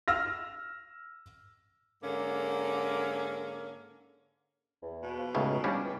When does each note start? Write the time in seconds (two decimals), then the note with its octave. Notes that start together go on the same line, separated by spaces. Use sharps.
0.08 E6 F6 A#6
2.02 G#2 D3 A#3 C#4
4.82 E2
5.03 B2
5.17 F3
5.35 C#2 A2 C#3 D#4
5.64 F3 G3 C#4 D4
5.84 C#2 E3